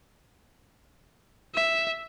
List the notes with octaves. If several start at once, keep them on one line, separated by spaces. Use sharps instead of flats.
E5